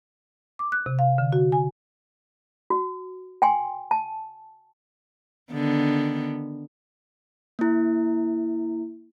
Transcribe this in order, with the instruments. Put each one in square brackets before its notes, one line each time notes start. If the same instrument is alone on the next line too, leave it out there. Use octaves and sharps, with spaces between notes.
[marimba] D6
F#6
C3
F5
D3
F#4
G#5
[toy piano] F#4
G5 G#5 C6
A5
[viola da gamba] D3 D#3 B3
[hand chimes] A#3 E4